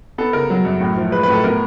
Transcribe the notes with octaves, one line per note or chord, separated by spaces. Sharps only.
B3 A4
C#3 A#4
F#3
F#2
A2
F3
G#3 B4
B4
A2
A4
B3 A#4